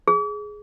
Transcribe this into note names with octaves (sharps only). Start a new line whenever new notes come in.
G#4